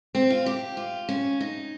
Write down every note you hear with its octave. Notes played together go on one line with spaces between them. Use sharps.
C4
F4
G4
F4
C#4
D#4